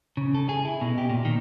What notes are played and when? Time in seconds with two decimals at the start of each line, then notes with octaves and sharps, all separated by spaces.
0.17 C#3
0.34 A4
0.49 G#4
0.65 E4
0.81 B2
0.98 G4
1.09 A#2
1.25 D#3